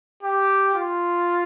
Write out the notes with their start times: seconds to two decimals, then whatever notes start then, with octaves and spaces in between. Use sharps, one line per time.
0.23 G4
0.75 F4